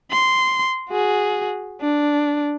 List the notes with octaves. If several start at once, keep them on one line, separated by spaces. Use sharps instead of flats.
C6
F#4 G#4
D4